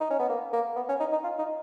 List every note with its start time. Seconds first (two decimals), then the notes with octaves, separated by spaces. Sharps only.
0.01 D#4
0.11 C#4
0.19 B3
0.30 A#3
0.53 A#3
0.76 B3
0.89 C#4
1.00 D#4
1.12 D#4
1.24 F4
1.39 D#4